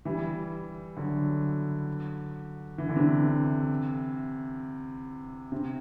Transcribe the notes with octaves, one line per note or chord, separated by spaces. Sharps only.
E3 G3
D3 F#3
E3
D3
C3 E3
C3